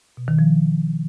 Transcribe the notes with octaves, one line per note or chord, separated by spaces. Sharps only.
B2
D#3
F3